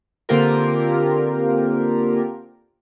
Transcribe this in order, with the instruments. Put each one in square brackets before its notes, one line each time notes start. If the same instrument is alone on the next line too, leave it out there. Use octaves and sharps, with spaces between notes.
[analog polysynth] D3 A#3 C4 F4 G4 A#4